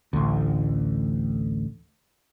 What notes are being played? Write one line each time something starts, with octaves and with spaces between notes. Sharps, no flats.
A1 D2